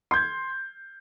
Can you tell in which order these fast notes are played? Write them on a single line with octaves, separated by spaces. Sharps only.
C6 G6 G#6